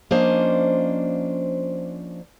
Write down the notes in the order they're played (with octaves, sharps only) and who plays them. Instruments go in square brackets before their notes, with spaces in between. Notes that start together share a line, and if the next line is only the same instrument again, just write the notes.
[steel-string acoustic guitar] F3 A#3 C#4 D4 C5 D#5